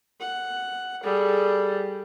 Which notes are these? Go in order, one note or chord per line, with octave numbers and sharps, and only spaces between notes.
F#5
G3 G#4 A4